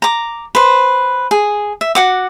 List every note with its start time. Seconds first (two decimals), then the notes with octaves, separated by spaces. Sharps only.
0.02 A#5 D6
0.55 B4 C5
1.31 G#4
1.81 E5
1.95 F#4 F#5 D6